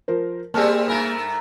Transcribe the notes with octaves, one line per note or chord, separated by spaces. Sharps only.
F3 A#4 C5
G3 A3 A#3 C4 G#4 A5 C#6 F6
G2 A3 A#4 G#5 B5